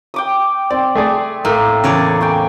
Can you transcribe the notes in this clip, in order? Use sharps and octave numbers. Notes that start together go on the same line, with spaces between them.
G5 D6 D#6
C4 D5
A3 G#4 D5
A2 A#3
E2 C#3 C#5 D5
G5 G#5 C#6